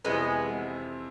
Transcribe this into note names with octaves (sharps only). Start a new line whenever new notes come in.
F2 C3 E3 G#3 B3